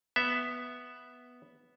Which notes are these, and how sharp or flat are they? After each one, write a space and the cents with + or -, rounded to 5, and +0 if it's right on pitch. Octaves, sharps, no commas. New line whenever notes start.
B3 +0 E5 +0